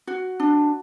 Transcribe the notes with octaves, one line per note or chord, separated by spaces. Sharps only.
F#4
D4